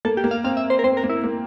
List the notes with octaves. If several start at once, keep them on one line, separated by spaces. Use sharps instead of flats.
A#3 A4
G4
A#3
F5
C4 F5
E5
C5
A#4
C4 C5
A#4
A#3
E4
A#3